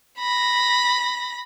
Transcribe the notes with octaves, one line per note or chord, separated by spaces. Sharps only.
B5 A#6